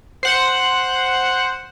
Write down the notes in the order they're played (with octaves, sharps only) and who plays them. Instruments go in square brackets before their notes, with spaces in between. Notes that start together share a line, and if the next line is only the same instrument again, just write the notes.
[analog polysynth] C5 F#5